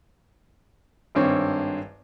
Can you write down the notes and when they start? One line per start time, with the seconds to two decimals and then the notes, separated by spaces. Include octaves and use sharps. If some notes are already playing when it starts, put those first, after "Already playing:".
1.15 G#1 G2 C4 C#5